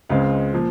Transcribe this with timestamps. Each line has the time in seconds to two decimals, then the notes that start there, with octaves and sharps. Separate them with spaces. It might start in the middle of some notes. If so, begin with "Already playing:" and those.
0.09 C#2 C#3 G#3 C4 F5
0.53 A#2 F3